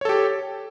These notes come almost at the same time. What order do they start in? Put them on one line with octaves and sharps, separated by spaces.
C#5 A4 G4